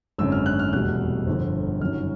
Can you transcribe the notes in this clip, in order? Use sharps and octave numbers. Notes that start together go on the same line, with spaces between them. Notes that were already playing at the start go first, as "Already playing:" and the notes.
G#1 F#2 D3 E6
F6
F#6
F6
F1 E2 B2 G3 F#6
G1 F2 D3
G1 F#2 D#3 F#3 F6